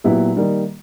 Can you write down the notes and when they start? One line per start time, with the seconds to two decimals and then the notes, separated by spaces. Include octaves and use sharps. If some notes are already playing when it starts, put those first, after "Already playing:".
0.04 A#2 F#3 B3 E4 G4
0.36 D#3 G3 A#3 D#4